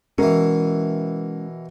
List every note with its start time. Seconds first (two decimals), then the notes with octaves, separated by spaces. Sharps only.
0.18 B2 E3 G#3 C#4 A#4